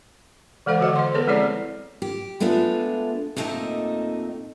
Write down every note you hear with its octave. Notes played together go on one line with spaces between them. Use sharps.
E3 G#3 A4 C5 F5
D3 F#4 D#5 F#5
C5 C6
B3 G#4 A4 B4 C#5
F3 G#3 C4 E4 C#5 D5
G4
G#3 A3 B3 D4 F4
D#2 A#2 A3 C4 D#4 D#5